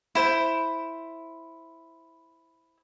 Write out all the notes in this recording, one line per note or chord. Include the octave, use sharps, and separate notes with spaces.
E4 C5